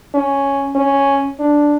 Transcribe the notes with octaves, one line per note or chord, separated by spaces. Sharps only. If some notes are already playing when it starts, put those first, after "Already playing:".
C#4
C#4
D4